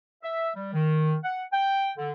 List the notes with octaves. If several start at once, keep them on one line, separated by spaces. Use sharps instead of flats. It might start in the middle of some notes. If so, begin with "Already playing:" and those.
E5
G3
D#3
F#5
G5
D3